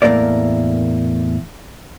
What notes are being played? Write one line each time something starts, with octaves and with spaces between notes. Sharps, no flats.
E2 A2 F#3 A#3 A#4 D5